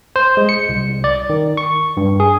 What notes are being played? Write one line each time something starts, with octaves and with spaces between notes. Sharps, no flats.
C5
G#3
C#7
C2
D5
D#3
C#6
G2
G#4